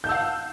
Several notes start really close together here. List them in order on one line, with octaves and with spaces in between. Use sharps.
G6 A5 E6 F#5 F5